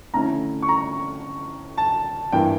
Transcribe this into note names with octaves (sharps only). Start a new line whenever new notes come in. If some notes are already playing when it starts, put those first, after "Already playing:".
F2 D3 A3 C#4 E4 A#5
C#6
A#5
A5
G2 E3 A#3 E4 G5